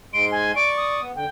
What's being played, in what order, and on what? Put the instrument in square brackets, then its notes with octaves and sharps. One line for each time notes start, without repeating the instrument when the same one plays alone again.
[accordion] G#2 G#3 C6 [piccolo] D7
[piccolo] G#5
[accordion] D5 C#6 [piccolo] D7
[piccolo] D#6
[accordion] B3
[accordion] D3 [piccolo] G5